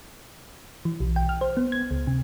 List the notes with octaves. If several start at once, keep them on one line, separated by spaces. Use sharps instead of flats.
E3
B1
G5
F6
C5
B3
G#6
C#2
C3